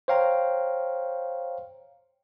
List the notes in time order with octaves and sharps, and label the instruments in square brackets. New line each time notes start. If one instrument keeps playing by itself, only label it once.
[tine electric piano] C5 C#5 F5 G5 A#5